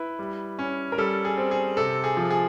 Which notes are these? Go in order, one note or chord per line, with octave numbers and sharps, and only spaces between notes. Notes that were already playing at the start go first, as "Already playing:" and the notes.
Already playing: E4 B4
G3
C#4
A#4
G3 A4
G#4
C4
G#4
C3 A4
G#4
F3
G#4